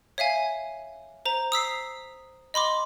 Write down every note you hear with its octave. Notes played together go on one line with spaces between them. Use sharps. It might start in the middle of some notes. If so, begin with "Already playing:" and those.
C#5 E5 F5 G#5
C5 A#5
D#6 E6 B6 C7
D#5 B5 C6 D6